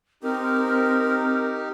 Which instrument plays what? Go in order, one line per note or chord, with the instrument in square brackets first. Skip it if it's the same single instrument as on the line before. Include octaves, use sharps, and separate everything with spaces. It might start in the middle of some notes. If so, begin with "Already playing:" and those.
[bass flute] C4 [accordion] D#4 G4 [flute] A#4